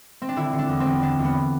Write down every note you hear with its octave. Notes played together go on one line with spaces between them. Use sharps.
C4
D4
D3 E4
D3
D4
E2
C4
E2
D3 D4
E2
B3